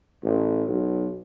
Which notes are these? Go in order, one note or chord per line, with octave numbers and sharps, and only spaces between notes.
A1
B1